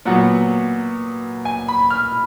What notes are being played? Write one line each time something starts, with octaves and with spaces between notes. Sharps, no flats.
A#2 F#3 B3 F#5
G#5
B5
F6